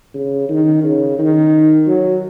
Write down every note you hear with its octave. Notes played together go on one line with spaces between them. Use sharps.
C#3
D#3
C#3
D#3
F#3